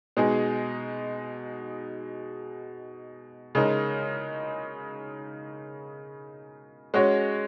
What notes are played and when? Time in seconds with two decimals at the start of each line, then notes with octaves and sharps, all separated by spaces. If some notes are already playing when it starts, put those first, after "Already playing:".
0.17 B2 G#3 D#4 G#4
3.55 C#3 G#3 D#4 A#4
6.94 G#3 C#4 F#4 C#5